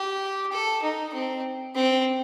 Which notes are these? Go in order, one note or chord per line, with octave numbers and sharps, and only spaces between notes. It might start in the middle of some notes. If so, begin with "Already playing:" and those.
Already playing: G4
A4
D#4
C4
C4